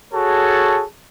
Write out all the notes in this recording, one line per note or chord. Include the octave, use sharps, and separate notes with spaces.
F#4 G#4 A4 C#5 A5